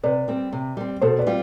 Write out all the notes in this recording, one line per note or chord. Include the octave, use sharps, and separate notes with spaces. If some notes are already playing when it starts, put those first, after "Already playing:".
C3 B4 D5
G3 C4
C3
G3 C4
B2 A4 C5
B4 D5
G3 C4 F4